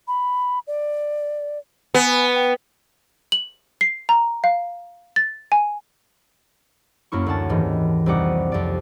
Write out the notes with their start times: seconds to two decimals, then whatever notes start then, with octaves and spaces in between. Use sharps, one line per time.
0.08 B5
0.67 D5
1.94 B3 G#5
2.35 G5
3.32 F#7
3.81 C7
4.09 A#5
4.44 F5
5.16 A6
5.52 G#5
7.12 F#2 A#3 E4 C#6
7.26 D2 F#5 A5
7.49 D#2 G#2 E3
8.06 C2 F2 G3 D#4 F#5 D6
8.52 F2 D5